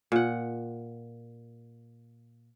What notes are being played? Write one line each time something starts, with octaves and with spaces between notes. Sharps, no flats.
A#2 F#5